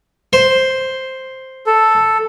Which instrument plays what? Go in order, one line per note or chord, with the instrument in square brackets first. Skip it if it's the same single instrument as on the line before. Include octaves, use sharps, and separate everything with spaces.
[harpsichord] C5
[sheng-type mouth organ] A4